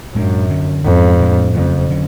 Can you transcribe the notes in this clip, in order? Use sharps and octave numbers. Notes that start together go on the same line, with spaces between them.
F#2 A2 G#3 B3 D4
D3 F#3 C#4
F2 G#2 G#3 C#4
A2 G#3 D4
F2 C#3 F#3 A3
D3 F#3 C#4